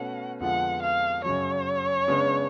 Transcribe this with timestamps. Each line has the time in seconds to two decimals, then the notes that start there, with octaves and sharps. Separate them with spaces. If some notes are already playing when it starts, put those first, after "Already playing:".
Already playing: B2 A3 C#4 F#4 B4 F#5
0.40 F2 D3 G#3 B3 F4 F#5
0.82 F5
1.24 F#2 C#3 F#3 C#5
2.08 C#3 G#3 B3 D4